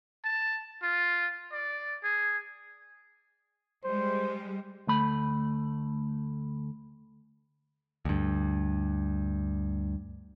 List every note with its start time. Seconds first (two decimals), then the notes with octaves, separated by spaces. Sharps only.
0.24 A5
0.82 F4
1.52 D5
2.03 G#4
3.84 G3 G#3 C5
4.87 D2 A3 B5
8.05 D2 G2